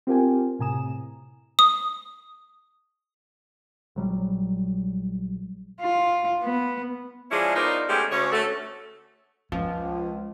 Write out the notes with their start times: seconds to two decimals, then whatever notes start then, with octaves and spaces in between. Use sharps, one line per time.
0.07 C4 F4 G4 A#4 G5 G#5
0.59 A2 C3 G#5 A#5 D#6 E7
1.59 D#6
3.96 A#1 F#3 G3
5.80 F4
6.42 B3
7.31 F3 G#3 C#4 D4 E4 G#4
7.56 B3 D#4 F4 A#4 C5 D5
7.89 G#3 A3 B3 C#4 G4
8.11 D2 C#4 C#5
8.32 A3 F#4 A4
9.52 C#2 F3 C#4